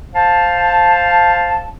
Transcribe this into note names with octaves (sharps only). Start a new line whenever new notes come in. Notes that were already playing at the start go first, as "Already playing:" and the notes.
C5 F5 A5